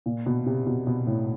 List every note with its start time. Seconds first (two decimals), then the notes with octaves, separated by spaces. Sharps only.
0.06 A#2
0.26 B2
0.46 C3
0.67 B2
0.87 B2
1.07 A2